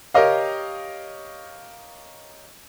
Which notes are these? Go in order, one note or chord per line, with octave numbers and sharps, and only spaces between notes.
G4 A#4 C#5 D#5 F5